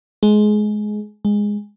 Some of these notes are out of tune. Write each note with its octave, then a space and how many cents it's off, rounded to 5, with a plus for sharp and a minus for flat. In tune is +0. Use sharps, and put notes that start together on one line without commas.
G#3 +20
G#3 -10